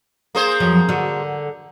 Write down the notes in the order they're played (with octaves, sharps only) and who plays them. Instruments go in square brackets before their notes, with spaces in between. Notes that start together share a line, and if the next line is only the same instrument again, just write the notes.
[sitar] A#3 G#4 C5
[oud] F2 F3 F#3
D3 F#4